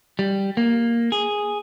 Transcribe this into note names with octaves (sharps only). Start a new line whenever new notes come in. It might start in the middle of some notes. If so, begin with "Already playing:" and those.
G3
A#3
G#4